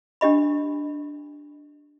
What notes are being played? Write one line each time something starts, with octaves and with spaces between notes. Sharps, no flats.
D4 G4 D#5 B5